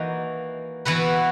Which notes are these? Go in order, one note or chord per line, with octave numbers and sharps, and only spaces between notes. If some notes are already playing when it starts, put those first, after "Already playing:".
Already playing: E3 A#3 D#4 F#4
E3 B3 F#4 B4